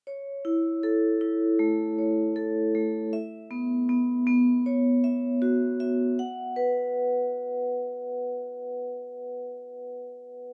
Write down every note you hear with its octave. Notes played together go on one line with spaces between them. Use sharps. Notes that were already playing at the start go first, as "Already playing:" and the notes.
C#5
E4
A4
E4
A3
C#5
A4
A3
E5
B3
B3
B3
C#5
E5
F#4
E5
F#5
B4